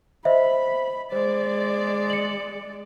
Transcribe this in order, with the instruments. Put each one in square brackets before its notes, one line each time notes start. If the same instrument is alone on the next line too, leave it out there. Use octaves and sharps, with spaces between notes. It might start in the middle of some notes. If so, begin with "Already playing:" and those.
[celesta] C5 D#5 E5 [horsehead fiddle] B5
[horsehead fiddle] G#3 D5 [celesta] C5
[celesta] C#7 F#7